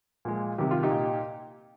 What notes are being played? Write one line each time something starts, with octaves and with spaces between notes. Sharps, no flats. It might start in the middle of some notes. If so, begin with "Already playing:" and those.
A#2 F3 G#3
C3 D#3 G3 G4
F4
D#4 G4
A#2